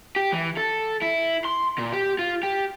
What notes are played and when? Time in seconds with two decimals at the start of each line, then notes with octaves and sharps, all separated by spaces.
0.16 G4
0.32 E3
0.57 A4
1.02 E4
1.45 C6
1.79 A#2
1.93 G4
2.19 F4
2.43 G4